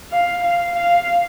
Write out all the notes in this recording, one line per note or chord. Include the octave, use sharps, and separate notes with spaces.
F5
F5
F5